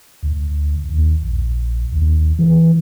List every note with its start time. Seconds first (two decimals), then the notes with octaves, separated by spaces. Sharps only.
0.23 D2
0.89 D#2
1.22 A#1
1.92 D#2
2.39 E3